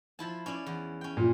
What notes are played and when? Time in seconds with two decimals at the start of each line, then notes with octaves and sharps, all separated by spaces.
0.19 F3 E4 A5
0.46 C#4 E4 D5
0.66 E2
1.01 C#4 G5
1.17 A#2